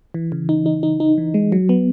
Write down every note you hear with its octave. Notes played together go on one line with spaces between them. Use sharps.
E3
C#3
D#4
D#4
D#4
D#4
E3
G#3
F#3
B3